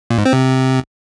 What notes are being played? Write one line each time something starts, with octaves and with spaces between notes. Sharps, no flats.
A#2
G#2
C4
C3